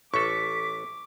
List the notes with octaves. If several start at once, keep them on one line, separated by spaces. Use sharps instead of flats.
A1 A4 C#6 D6 B6